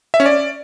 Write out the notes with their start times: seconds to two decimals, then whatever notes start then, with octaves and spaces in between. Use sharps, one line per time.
0.14 E5
0.20 C#4
0.26 D5